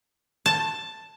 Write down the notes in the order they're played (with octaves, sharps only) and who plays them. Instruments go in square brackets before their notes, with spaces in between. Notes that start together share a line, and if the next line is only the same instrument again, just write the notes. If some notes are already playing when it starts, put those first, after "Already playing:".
[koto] A5